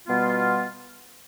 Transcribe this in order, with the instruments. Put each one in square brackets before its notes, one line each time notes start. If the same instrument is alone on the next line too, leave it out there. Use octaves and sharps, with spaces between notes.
[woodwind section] B2 G3 B3 F4